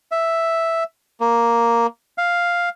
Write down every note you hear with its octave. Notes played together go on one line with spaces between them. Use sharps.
E5
A#3
F5